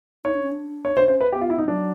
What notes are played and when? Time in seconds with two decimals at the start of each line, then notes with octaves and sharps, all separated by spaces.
0.25 D#4 C#5
0.34 D4
0.43 C#4
0.52 D4
0.85 C#5
0.96 D4 C5
1.08 C#4 C5
1.21 B4
1.32 B3 G4
1.41 F4
1.50 E4
1.58 D#4
1.68 F#3 D4